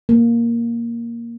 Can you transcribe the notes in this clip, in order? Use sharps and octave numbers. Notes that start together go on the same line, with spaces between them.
A#3